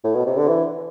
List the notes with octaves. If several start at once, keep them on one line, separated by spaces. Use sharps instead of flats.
A2
B2
C3
D3
E3